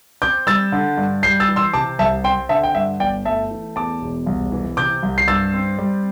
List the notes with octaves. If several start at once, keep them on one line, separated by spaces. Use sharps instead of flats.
C4 D6 G6
G3 E6 A6
D3
G2
G3 G6 C7
E6 A6
E3
C6 E6
C3 A5 D6
C2 E5 A5
C4 G5 C6
D3 E5 A5
G5
G2 E5
G1 D5 G5
A3 E5 A5
E3
E2 A5 D6
E1
C2
E3
C3 D6 G6
C2
C7
G2 E6 A6
C4
G3